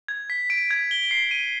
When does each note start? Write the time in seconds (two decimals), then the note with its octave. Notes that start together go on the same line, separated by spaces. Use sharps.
0.08 G#6
0.30 B6
0.50 D7
0.71 G#6
0.91 G7
1.11 C7
1.31 D#7